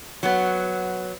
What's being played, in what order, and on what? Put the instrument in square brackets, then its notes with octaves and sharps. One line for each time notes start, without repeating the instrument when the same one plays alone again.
[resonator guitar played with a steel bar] F#3 B3